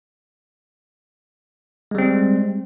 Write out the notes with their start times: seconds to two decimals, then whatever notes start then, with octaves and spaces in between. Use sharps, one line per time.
1.91 G#3
1.95 G3
1.98 C4